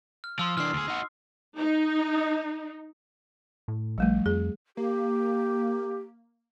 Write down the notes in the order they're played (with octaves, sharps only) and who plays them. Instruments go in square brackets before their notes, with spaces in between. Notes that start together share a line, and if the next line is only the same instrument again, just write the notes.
[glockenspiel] F6
[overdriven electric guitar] F3 [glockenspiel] C6 D#6 E6
[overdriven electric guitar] E3 D4 [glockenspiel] F6 C7
[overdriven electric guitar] D2 G#4
D#4 F#4
[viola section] D#4
[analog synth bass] A2
[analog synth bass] A#1 [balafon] F3 G3 A3
[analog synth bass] F2 [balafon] G#4
[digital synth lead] A#3 [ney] G4